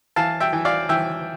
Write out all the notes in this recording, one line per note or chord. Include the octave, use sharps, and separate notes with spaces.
E3 F5 A5
E5 G5
E3
D5 F5
E3 E5 G5